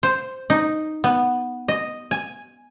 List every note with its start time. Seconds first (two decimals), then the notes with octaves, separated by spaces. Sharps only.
0.03 C5
0.50 D#4
1.04 B3
1.68 D#5
2.11 G#5